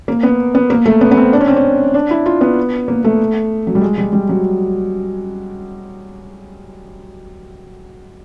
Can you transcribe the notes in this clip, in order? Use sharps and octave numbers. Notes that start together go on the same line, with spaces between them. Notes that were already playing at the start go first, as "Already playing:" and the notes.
A#3
B3
B3
A#3
A3
B3
B3
C4
D4
C#4
C4
C#4
D4
E4
F4
B3
A#3
A3
F#3
G3
G#3
G3
G3
F#3